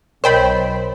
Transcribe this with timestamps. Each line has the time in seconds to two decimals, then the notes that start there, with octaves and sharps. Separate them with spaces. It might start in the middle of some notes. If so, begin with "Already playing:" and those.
0.24 B1 A#4 C5 C#5 D#5 G5 B5